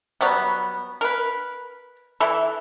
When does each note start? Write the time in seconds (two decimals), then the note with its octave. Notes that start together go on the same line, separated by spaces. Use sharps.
0.21 F#3 G3 B3
1.01 A#4 B4
2.20 E3 E4 A4